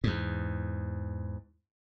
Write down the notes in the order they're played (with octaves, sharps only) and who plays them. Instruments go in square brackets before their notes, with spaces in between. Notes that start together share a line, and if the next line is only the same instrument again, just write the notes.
[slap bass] E2 G#2